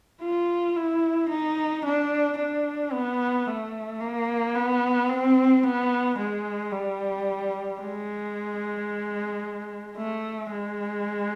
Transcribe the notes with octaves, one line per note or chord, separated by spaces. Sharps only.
F4
E4
D#4
D4
D4
B3
A3
A#3
B3
C4
B3
G#3
G3
G#3
A3
G#3